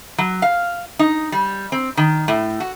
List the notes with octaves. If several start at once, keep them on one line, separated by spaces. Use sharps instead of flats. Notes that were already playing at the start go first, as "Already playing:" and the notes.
F#3
F5
D#4
G3
C4
D#3
A2
F#4